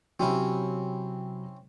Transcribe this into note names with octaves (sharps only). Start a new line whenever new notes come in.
C3 F#3 C4 C#4 E4